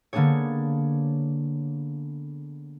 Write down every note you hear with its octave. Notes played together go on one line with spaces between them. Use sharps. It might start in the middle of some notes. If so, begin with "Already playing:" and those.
D3 A#3 B3 D4 G#4 C#5